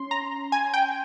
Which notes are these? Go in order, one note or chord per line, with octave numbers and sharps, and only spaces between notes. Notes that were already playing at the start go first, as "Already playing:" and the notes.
Already playing: C#4 C6
A#5
G#5
G5